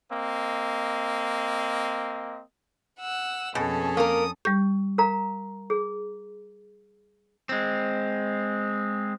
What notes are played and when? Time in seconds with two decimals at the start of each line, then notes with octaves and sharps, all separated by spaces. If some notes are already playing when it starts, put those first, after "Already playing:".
0.10 A#3 C4 D#5
2.99 F#5 E6
3.55 F2 B2 C#4 G#4 A4
3.97 A#3 A#4 D#6
4.45 G3 G4 G6
4.98 A#4 F5 A#5
5.70 G#4
7.49 G#3 C4